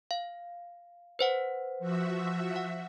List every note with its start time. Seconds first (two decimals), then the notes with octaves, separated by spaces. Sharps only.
0.11 F5
1.19 B4 C5 F#5
1.79 F3 F#4 E5
2.56 F#5